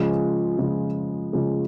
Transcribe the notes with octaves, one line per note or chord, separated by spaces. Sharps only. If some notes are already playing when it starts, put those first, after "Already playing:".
Already playing: C#3 F3 G#3
C#3 F3 G#3
C#3 F3 G#3